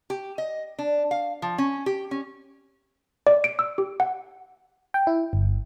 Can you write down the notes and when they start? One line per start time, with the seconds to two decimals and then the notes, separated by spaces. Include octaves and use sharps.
0.10 G4
0.38 D#5
0.79 D4
1.11 F5
1.42 F3
1.58 C#4
1.86 G4
2.11 C#4
3.27 D5
3.44 D7
3.59 E6
3.78 G4
4.00 F#5
4.94 G5
5.07 E4
5.33 G1